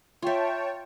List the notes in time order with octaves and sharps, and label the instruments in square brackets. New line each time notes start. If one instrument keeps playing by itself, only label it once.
[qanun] F4 E5 [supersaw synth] C#5 G5 A5